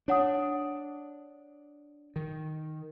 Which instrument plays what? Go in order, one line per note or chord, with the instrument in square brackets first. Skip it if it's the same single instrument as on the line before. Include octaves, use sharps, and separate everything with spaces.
[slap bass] D4 [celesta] C#5 F#5 D#6
[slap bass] D#3